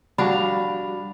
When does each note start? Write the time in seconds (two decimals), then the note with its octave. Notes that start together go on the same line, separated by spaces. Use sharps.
0.18 G3 D4 F#4 G4 F5 B5